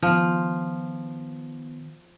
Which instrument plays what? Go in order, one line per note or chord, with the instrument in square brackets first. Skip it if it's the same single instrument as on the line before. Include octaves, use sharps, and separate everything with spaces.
[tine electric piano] D#3 B3 [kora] F3